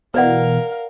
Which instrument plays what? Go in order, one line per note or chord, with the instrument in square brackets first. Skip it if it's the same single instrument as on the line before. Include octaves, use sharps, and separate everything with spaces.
[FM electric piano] B2 E3 [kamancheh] A#4 F5 [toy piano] B4 D5 F#5